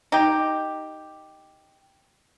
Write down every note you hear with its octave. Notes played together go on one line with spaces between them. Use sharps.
D#4 G4